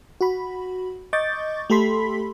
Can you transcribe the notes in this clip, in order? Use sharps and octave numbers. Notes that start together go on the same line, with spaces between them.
F#4 B5
D#5 C#6 D6 G6 A6
A3 G4 A4 B5 C6 B6